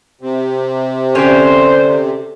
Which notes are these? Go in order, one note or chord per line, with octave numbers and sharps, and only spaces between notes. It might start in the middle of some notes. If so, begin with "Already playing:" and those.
C3
D3 C#4 G4 C5